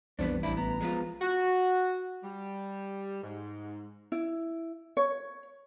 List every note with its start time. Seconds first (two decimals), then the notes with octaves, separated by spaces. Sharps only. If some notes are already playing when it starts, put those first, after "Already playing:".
0.19 B1 F2 E3 G3 B3 C#4 D4 C5
0.43 A1 D4 E4 B5
0.57 B3 A#5
0.81 F3 G#3 B3 F4
1.21 F#4
2.24 G3
3.23 G#2
4.12 E4
4.97 C#5